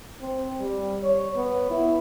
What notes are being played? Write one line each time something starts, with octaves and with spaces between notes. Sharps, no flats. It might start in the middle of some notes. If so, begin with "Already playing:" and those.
C4
G3
C#5
B3
E4